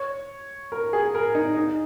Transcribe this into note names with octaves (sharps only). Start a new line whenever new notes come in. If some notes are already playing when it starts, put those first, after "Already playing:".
Already playing: C#5
A#4
G#4
A#4
D#4
D#4